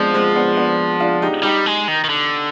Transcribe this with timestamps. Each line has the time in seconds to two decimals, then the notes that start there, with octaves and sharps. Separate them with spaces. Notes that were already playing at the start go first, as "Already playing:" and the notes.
Already playing: F3 G#3 B3 C4 D4
0.14 G#3 C4
0.35 B3 D4
0.57 B3 D4
1.00 D4 F4
1.22 D#4 G4
1.43 G3 D#4 G4
1.66 G#3
1.88 D#3
2.04 D#3
2.09 D3